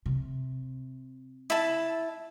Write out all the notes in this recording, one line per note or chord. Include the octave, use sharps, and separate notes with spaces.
C3
E4 A5